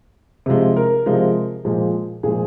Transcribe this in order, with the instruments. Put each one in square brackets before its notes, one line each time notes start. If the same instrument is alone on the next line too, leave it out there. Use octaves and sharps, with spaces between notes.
[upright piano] C3 F3 G#3
A#4
C3 F3 G#3
A#2 F3 G#3
A#2 F3 G#3 G#4